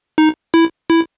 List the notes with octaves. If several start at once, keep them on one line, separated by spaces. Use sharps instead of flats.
D#4
E4
E4